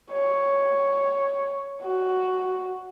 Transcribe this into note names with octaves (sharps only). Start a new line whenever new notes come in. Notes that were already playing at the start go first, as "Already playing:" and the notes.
C#5
F#4